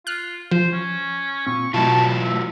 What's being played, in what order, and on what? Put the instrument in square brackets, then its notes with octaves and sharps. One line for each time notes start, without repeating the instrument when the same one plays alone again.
[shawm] F4 [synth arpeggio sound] F6 F#6
[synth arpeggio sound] F3 [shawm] C5
[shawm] C#4
[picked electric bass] A#2 C4 [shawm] C#6
[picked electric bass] B2 A3 [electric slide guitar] F#3 E4 F4 [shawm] A5
[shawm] E5